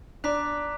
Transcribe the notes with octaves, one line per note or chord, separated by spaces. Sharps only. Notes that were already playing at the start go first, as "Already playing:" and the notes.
D4 A#5 D6 F#6 B6